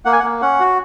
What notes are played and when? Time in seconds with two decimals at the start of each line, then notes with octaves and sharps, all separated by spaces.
0.05 A#3 F#5
0.13 G#5
0.19 F#5
0.24 A#3
0.42 C#4 F#5
0.60 F#4